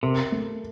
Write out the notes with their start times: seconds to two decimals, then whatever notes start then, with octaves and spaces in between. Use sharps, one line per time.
0.03 C3 A#4
0.32 A3